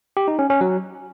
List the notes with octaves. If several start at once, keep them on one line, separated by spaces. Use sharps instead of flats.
G4
D#4
C#4
C#4
F#3